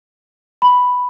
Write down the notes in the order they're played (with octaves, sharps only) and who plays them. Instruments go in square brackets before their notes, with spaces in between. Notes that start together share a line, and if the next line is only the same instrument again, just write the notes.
[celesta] B5